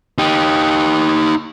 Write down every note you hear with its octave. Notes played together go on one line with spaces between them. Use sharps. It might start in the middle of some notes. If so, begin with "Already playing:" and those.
D#4 G4